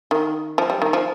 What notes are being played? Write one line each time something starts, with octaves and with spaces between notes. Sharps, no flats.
D#3
F3
G3
D#3
F3